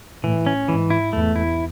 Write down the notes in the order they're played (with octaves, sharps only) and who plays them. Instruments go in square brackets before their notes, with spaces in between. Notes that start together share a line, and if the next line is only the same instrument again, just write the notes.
[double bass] A2 [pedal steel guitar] E3
[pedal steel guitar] C#4
[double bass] G#2 [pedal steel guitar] E3
[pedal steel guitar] E4
[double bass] E2 [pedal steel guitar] A3
[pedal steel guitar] E4